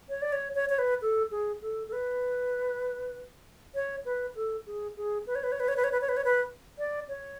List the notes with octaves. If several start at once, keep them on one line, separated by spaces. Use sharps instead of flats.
C#5
D5
C#5
C#5
C#5
B4
A4
G#4
A4
A4
B4
C#5
B4
A4
G#4
G#4
B4
C#5
B4
C#5
B4
C#5
B4
C#5
B4
C#5
B4
C#5
B4
D5
C#5